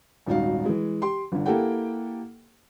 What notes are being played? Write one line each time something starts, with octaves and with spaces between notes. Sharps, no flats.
D#1 G#1 D#4 F#4 F5
E3 G#3
G4 C6
G1 D3
A#3 E4 G4 A4 F#5 G5